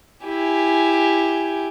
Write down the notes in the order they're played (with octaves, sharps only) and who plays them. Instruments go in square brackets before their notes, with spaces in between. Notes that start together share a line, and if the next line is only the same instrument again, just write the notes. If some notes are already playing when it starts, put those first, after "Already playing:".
[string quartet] E4 G4 G#5